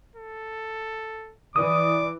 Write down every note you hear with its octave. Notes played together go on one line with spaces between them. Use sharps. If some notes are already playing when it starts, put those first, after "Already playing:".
A4
E3 D5 D6 D#6